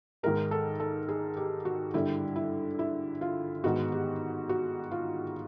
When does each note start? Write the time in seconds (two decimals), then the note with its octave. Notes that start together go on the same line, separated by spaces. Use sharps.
0.23 G#2 D#3 G#3 A#4
0.51 A4
0.80 A4
1.08 G#4
1.37 G4
1.65 F#4
1.94 G2 D3 G3 E4
2.36 E4
2.79 E4
3.21 F4
3.64 G#2 D#3 G#3 B3 F#4
3.92 G4
4.49 F#4
4.91 F4